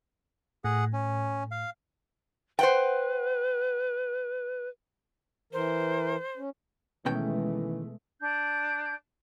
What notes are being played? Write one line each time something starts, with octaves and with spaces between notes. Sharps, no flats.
A2 G#4 F#5
C#4
F5
B4 C5 F#5 G5
E3 A#4 C5
C#4
B2 D#3 E3 G#3 A3 C#4 G5
D4 G6